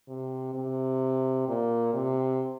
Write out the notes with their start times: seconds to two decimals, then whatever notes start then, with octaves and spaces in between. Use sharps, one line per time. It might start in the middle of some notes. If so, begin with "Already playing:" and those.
0.09 C3
0.55 C3
1.48 A#2
1.93 C3